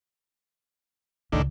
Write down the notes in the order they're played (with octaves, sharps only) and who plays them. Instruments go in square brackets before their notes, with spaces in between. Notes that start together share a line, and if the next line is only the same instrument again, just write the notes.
[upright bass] C#2 [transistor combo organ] A2 D#3 D4